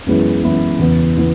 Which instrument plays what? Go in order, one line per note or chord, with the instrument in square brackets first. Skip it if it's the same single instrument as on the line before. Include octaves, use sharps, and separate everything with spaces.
[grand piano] F#2 E3 G#3 B3 E4
F#2 E3 G#3 B3 E4
E2 C#3 E3 B3
C#3 E3 B3